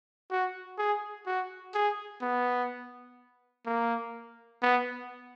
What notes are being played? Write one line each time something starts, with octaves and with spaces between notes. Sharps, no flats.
F#4
G#4
F#4
G#4
B3
A#3
B3